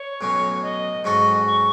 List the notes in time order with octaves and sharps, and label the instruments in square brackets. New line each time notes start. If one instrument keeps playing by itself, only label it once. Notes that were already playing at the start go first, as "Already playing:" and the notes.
Already playing: [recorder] C#5
[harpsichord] B1 A2 F#3 C#4
[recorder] D#5
[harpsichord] G#2 F#3 C#4 F#4 A4
[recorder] C#6